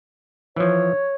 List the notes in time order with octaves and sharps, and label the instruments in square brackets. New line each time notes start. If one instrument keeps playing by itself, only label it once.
[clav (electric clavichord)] E3 F3 [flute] C#5